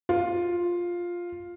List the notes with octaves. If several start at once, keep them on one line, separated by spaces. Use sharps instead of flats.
F4